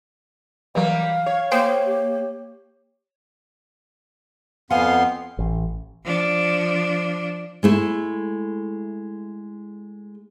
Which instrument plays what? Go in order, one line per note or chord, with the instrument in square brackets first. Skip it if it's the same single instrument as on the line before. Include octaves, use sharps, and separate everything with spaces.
[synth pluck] E3 F#3 [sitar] G3 A#3 [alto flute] F5
[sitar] C#5
[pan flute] A#3 [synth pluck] G#4 C5 G5
[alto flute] G4
[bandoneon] F2 B3 C6 [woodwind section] F5 [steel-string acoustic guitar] F#5 G#5
[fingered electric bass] A1
[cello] F3 D4
[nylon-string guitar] G#3 A3 E4